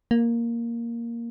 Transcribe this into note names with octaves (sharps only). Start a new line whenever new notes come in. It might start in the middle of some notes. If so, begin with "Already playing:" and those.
A#3